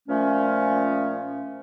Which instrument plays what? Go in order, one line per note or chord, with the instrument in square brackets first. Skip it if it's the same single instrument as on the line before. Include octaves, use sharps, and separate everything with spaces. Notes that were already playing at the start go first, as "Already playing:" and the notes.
[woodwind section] A#2 F3 A3 C#4